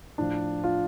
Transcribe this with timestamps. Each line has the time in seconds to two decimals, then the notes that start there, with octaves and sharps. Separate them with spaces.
0.18 A2 F3 D4
0.64 F4